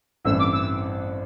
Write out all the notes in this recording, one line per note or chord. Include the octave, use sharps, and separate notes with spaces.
A1 G2 E3 A3 C4 E6
D6
E6